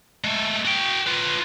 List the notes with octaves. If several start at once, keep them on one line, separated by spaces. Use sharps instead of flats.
G#3 A3
F#4 G5
F4 B4